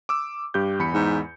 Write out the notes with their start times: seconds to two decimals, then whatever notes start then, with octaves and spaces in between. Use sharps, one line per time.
0.09 D6 E6
0.54 G2 G4 G6
0.79 E2 B5 C#7
0.94 G#2